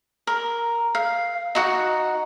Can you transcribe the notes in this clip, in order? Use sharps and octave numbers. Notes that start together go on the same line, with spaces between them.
A#4
F5
D#4 F#4 F#5